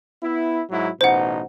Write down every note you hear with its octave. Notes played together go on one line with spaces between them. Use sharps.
B3 E4
G#2 F#3 E4
A1 B2 D#4 C5 F#5